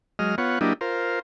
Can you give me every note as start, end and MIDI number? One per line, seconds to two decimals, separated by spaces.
0.19 0.35 54
0.19 0.35 56
0.19 0.35 75
0.19 0.35 89
0.38 0.59 59
0.38 0.59 65
0.38 0.59 73
0.38 0.59 78
0.61 0.73 54
0.61 0.73 58
0.61 0.73 62
0.61 0.73 64
0.61 0.73 67
0.61 0.73 75
0.81 1.19 65
0.81 1.19 70
0.81 1.19 72